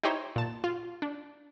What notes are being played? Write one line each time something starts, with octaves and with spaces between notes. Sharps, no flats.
D#4 E4 G4 C5 C#5
A#2 A5
F4
D4